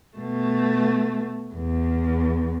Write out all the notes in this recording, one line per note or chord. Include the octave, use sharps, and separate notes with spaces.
B2 A3
E2